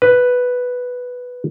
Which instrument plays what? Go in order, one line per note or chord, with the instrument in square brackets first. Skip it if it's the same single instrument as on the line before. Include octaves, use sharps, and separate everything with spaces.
[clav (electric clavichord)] B4